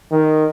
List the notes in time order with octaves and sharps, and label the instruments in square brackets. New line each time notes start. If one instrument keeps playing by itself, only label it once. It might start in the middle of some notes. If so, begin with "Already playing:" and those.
[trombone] D#3